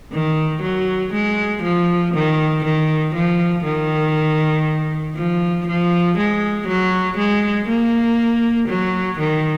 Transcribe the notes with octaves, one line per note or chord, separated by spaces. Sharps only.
D#3
F#3
G#3
F3
D#3
D#3
F3
D#3
F3
F3
G#3
F#3
G#3
A#3
F#3
D#3